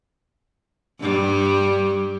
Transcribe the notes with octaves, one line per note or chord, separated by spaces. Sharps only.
G2 G3